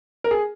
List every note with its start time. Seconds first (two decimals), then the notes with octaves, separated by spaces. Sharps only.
0.24 A#4
0.31 G#4